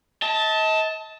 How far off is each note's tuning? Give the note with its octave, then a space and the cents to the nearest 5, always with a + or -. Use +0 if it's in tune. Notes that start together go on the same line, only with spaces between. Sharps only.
D#5 +40 A5 +0